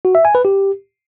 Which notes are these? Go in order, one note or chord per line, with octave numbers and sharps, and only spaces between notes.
F#4
E5
G#5
B4
G4